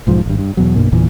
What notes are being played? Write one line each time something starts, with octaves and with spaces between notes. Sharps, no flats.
B1 G#2 F3
G#1 G2
G2
E2 B2 F#3
B1 G2 B2 A#3
G1 E2 A#2 E3